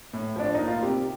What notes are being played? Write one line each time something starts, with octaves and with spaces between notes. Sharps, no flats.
A2
F3 D4
A#3 D#4
F4
C3 G4